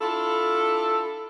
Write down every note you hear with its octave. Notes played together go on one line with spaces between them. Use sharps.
D4 E4 F4 A4